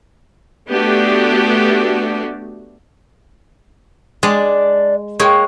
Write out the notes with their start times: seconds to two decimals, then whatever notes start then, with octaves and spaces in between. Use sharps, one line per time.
0.69 A3 B3 D4 F#4 G4
4.23 G#3 D4 D5
5.20 G#3 A#3 C#5 G5